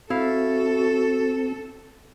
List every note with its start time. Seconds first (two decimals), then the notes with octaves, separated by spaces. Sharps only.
0.10 C4 E4 F#4 A4 F5